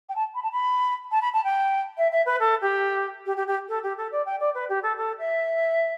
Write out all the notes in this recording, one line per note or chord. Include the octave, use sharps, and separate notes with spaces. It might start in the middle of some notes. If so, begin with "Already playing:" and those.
G5
A5
B5
A5
B5
A5
B5
A5
G5
E5
E5
B4
A4
G4
G4
G4
G4
A4
G4
A4
D5
G5
D5
B4
G4
A4
A4
E5